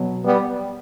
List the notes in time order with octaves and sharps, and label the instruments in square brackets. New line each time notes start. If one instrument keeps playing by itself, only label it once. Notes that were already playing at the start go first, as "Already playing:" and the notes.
Already playing: [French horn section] B2 F#3
G3 B3